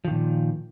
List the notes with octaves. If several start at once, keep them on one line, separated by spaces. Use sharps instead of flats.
A#2 D#3 F3